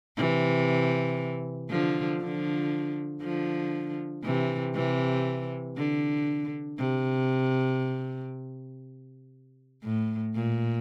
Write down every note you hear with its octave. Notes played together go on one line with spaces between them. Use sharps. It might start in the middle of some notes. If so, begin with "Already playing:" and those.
C3 E3
D3 F3
D3 F3
D3 F3
C3 E3
C3 E3
D3
C3
A2
A#2